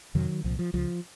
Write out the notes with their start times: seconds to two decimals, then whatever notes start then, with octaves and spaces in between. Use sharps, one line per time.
0.15 F2 C3 D#3 F#3
0.44 C2 A#2 F3
0.59 F3
0.74 C#2 C#3 F3